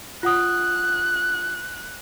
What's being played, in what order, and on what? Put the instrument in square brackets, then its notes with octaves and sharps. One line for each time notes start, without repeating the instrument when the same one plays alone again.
[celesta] F4 F#5 D#6 [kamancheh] F#6